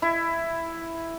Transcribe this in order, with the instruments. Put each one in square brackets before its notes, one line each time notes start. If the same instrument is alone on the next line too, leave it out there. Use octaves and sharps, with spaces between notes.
[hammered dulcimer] E4